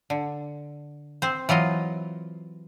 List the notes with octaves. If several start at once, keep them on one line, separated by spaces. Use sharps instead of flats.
D3
C4 C5
E3 F#3 F4 D#5